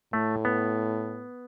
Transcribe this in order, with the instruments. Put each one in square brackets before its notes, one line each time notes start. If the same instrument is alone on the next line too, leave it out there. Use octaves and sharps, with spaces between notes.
[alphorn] A2 [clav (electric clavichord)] A3
[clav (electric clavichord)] B3